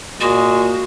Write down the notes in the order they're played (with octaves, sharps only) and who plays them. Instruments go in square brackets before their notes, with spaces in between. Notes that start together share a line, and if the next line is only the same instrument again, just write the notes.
[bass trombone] A#2 [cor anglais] G#3 [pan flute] F#4